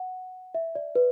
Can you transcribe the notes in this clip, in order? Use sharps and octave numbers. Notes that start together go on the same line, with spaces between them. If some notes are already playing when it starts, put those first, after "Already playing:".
Already playing: F#5
E5
D5
B4